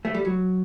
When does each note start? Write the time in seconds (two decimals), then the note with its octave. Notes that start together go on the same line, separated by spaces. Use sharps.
0.05 A3
0.14 G3
0.25 F#3